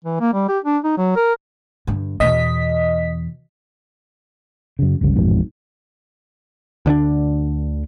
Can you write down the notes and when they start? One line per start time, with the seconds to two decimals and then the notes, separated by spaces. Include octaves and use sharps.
0.04 E3
0.20 A#3
0.33 G3
0.48 G4
0.64 D4
0.84 D#4
0.97 F#3
1.16 A#4
1.87 G2 D3
2.20 E2 B2 D#5 B6
4.79 F#2 C#3
5.01 G1 C#2 C#3 G3
5.15 A1 F2 G#2 B2
6.86 D2 D3 E3 D4